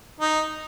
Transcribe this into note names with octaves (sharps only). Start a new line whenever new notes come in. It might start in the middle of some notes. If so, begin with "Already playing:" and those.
D#4